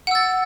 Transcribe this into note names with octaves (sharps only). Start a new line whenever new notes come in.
F#5 E6 A6